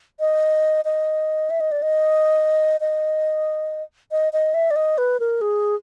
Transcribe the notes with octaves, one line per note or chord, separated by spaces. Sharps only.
D#5
D#5
E5
D#5
D5
D#5
D#5
D#5
D#5
E5
D5
D#5
B4
A#4
G#4